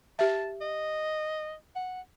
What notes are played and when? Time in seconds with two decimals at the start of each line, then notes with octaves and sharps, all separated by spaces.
0.19 G4 E5 A5
0.61 D#5
1.75 F#5